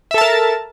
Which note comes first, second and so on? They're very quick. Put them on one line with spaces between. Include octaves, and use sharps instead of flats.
E5 A4 A5 A#4